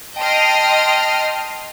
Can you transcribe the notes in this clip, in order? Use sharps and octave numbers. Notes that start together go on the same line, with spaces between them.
D#5 G5 A5 C6 D#6 F6